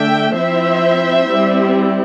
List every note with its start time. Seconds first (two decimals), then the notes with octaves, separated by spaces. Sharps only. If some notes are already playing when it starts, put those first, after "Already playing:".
Already playing: D3 A3 D4 E5 G5
0.36 F3 C4 E4 C5 E5
1.29 G3 C4 E4